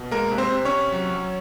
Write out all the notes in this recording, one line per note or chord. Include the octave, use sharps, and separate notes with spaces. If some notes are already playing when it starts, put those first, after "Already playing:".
Already playing: B2
G#3 A#3 A#4
C3
C4 C5
C3
C#4 C#5
C3
F#3
F#3